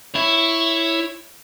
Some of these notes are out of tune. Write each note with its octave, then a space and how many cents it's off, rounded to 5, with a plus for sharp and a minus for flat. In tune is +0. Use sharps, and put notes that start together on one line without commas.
E4 +5 C#5 +0